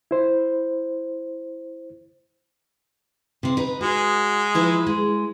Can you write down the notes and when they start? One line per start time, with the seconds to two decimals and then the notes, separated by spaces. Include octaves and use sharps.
0.11 E4 C5
3.43 C3 C4
3.57 D#4 B4
3.81 G#3 F#4
4.55 F3 E4 B4
4.87 G#3